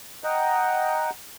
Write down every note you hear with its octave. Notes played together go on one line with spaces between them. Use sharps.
D#5 F#5 G5 A#5